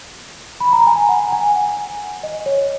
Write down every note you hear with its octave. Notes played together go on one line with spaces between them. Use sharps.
B5
A#5
G#5
F#5
G#5
F#5
D#5
C#5